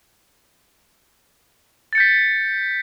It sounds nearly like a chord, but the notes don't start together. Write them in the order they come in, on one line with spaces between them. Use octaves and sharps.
A6 C#7 G6 B6